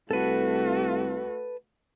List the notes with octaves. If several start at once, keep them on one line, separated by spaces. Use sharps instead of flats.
C2 A3 F#4 A4 B4